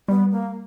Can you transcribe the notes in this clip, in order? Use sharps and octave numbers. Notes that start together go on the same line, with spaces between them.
G3 B3
A#3